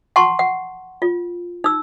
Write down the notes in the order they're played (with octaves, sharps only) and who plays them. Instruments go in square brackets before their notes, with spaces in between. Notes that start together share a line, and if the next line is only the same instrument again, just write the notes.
[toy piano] F#5 A5 C6 C#6
F#5
F4
D#4 E6